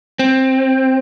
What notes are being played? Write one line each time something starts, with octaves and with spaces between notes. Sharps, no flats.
C4